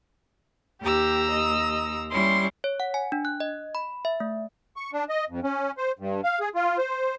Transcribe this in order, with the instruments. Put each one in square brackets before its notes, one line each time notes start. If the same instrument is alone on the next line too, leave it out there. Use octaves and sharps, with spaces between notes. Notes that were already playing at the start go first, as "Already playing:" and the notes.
[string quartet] D#2 A#5 E6 [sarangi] G4
[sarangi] D#5
[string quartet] G3 C#4 E4 [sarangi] C6
[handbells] C#5
F#5
G#5
D4
F#6
D#5
B5
E5
A3
[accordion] C#6
D4
D#5
F2
C#4
C5
G2
F5
G#4
F4
C5